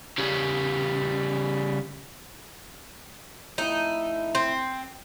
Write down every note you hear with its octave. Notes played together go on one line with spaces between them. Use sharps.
C#3 G3
F2 A2 D#4 E4
C4